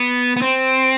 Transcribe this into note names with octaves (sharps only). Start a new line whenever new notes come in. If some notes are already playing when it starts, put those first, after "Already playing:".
Already playing: B3
B3
C4